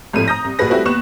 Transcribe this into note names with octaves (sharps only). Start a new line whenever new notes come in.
G#1 F2 A2 F3 A3 D#7
A#5 D#6 G6 A#6
C2
A#1 F#4 G#4 B4 A#6
G3 A3 C4 E4 F#4 B4
D#2 B3 C#6 F#6 E7